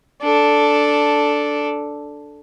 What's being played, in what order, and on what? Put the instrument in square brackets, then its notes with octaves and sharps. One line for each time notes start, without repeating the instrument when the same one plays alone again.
[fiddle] D4 A4